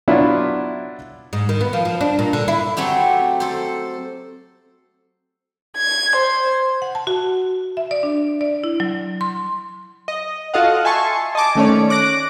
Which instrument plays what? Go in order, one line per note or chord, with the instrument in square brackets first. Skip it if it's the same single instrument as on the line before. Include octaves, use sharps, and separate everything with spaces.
[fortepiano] F#3 B3 D4 E4 F4
[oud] G#2
D#3
B3
F3
F3
D4
A#2
D3
E4
[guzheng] F#3 A3 C4 G4
A4 C5
[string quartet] G#6
C5
[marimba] F#5
A5
F#4
E5
D5
D4
D5
E4
F#3
C6
[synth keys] D#5
F4 F#4 A4 D#5 F5 F#5
E5 G#5 A5 C6 C#6
D#5 G#5 A5 D6
D#3 A3 C#4 C#5 D5
D6 F#6 A#6 D7